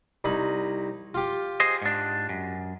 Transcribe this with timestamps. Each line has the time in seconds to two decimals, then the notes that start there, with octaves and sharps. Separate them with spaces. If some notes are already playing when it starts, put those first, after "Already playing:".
0.24 C2 D#4 B5
1.14 F4 G4
1.60 G#4 C5 D#5
1.82 G#2 D4
2.29 F#2